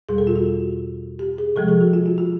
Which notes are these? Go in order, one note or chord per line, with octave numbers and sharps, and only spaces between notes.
E2 B2 G3 G#4
A4
F4
F#4
G4
G#4
C3 F3 G#3 A4
G#4
F#4
F4
F4
F#4